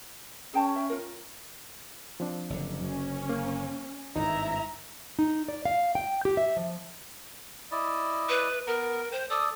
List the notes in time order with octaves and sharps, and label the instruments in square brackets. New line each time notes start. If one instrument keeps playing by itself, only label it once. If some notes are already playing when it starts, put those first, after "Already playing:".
[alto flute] C#4 [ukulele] G#4 G5 A5
[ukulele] E5 G5
F4 A#4
[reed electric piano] F3 C4 D4
[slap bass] F#1 D3
[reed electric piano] F#2 [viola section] C#4
[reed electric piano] A#3
[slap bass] G#1 G2 [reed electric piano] D#4 [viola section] E4 E5 A#5
[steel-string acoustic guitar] D#4
D5
F5
G5
G4
E5
F3
[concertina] E4 D5 D#5
[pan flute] B4
[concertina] B3 A#5 [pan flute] A#4
[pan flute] C5 [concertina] G5
[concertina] A4 D5 [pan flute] D#6